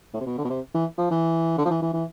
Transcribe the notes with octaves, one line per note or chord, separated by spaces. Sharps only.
A2
C3
B2
D3
B2
C3
E3
F3
E3
D3
F3
E3
E3
E3